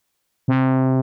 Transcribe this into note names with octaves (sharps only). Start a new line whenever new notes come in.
C3